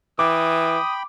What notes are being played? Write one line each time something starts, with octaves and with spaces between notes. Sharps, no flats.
E3 G5 B5 D6 D#6